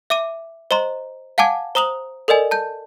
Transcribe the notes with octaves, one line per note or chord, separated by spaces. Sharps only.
E5 D6 D#7
C5 D#5 A#5 C6
F5 F#5 G#5 A5 D6 G#6
C5 A#5 D#6 F7 F#7
A4 A#4 D5 D#5 G#5
A5 G6